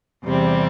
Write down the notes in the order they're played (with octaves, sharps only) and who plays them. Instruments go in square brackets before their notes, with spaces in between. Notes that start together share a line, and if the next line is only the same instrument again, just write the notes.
[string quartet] E2 C3 G3 C4